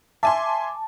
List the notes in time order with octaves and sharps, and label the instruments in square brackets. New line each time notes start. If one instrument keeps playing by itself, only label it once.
[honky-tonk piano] E5 G#5 C6 [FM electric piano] A5 D6